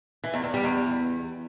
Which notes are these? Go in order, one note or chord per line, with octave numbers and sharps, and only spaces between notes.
E3
E2
E2
G3
E2